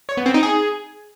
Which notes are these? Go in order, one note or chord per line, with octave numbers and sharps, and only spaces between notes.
C#5
B3
C4
D#4
G#4